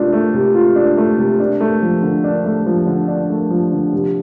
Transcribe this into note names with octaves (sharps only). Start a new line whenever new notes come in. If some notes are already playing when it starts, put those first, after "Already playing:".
Already playing: C3 A3 D4 F4
A3
C3
F4
D4
A3
C3
D4
A3
F3
D3
D4
A3
F3
D3
D4
A3
F3
D3
C3